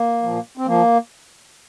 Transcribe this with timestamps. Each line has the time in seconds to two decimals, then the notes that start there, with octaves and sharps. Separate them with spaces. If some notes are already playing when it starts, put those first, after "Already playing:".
Already playing: A#3
0.23 A#2 F3
0.57 C4
0.66 F3 A#3